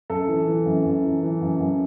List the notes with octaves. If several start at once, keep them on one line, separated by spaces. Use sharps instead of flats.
F#2 A4
E3
E3
F#2
F#2
E3
E3
F#2
F#2